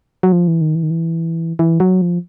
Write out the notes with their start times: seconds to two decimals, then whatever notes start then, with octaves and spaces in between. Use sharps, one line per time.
0.23 F#3
0.32 F3
0.48 E3
0.61 D#3
0.75 E3
0.83 D#3
0.90 E3
1.59 E3
1.80 F#3
2.02 F3